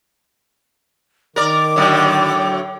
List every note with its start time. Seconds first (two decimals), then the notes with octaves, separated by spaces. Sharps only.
1.36 D#3 A#4 D5 D6
1.76 A2 D3 F#3